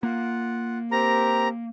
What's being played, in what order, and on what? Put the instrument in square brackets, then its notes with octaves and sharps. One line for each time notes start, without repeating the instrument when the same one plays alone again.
[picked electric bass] A#3 [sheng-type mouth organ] F4 F#5
[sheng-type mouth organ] C4 G4 A#4 [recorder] A#5